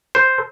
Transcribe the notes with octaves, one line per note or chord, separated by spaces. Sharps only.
C5